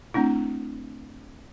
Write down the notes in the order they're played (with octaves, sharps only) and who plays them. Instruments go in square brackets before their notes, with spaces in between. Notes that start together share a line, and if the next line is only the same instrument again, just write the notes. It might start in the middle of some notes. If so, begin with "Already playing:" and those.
[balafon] A3 C4 D4 E4